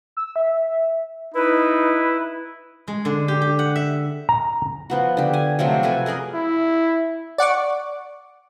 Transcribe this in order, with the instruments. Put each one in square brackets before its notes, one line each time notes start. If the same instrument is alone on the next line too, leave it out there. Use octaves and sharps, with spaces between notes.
[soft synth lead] E6
E5
[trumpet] D#4 [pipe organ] E4 [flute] B4
[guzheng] G#3
D3
G4
G4
F#5
E5
[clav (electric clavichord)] A#5
[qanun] F3 B3 F#4
D3 G4
G#5
C3 F3 F#3 A3
A4 B4 G#5
G#4 A#4 D5 D#5
[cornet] E4
[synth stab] D5 F#5 C#6 D6